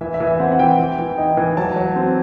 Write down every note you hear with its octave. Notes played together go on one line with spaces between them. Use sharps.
E3 E5
E5
E3
E5
C4 F#5
F#5
E3 G5
E3
E3
D#4
E3
F#3 A5
F#3
C4